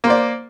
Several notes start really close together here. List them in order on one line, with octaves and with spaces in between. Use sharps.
A#3 C5 D5